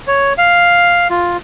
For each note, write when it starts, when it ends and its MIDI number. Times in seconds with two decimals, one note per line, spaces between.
0.07 0.33 73
0.38 1.08 77
1.10 1.37 65